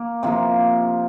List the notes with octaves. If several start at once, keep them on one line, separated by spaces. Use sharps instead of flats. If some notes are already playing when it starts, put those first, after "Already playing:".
Already playing: A#3
C3 F3 A#3